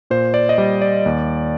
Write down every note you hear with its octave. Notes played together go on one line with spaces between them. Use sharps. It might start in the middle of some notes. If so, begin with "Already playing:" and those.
A#2 C5
D5
D#5
G3 D5
D5
D#2